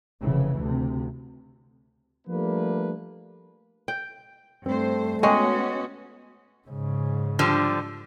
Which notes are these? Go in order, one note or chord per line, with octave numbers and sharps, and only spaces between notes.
F1 C#3 E3
D2 C3
F3 G3 A3 A#3 D4 B4
G5
G2 A3 C4 C5
G#3 B3 C#4 F#4 D#5 G5 C#6
G#2 C#3
D3 F3 G3